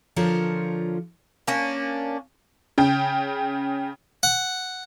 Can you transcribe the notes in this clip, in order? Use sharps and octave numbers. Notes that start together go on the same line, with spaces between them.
D3 F3 F4 A#4 C5 C#5
A#3 C#4 D4
C#3 G5
F#5